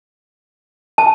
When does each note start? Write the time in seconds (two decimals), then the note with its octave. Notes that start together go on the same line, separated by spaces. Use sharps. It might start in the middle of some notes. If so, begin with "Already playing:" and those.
0.98 A5